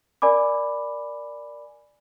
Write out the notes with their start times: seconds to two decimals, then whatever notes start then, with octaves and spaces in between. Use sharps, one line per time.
0.22 A#4 D5 G#5 B5 D6